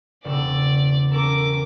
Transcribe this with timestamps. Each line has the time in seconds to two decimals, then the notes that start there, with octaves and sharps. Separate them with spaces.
0.25 E1 C#3 A4 D5
1.11 C#4 A4 A#4 D6